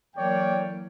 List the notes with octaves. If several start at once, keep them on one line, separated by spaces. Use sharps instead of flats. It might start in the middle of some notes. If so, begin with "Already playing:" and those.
E3 F#3 A#3 C#5 D5 G5